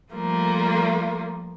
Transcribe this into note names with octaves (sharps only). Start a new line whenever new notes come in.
F3 G3 A3 A#3 F4